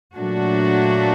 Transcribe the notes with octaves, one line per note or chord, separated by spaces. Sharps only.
A#2 F#3 A3 D4 F#4